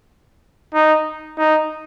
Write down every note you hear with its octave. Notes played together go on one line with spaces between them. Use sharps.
D#4
D#4